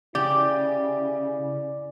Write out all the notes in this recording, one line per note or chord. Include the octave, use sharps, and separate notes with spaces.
C#3 E4 G4 D5